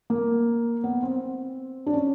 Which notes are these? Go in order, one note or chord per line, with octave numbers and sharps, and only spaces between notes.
A#3
B3
C4
D4
C#4